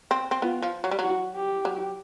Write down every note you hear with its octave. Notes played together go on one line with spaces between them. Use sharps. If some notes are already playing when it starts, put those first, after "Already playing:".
C4
C4
B3 F4
F3
F#3
G3
F#3 F#4
G4
F#3